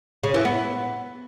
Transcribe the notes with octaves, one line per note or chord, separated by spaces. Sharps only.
C#3
E3
B3